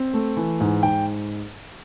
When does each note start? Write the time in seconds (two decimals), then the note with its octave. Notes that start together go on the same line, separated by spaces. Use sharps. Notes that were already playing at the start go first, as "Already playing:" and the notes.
Already playing: C4
0.13 A3
0.37 E3
0.60 G#2
0.83 G#2 G5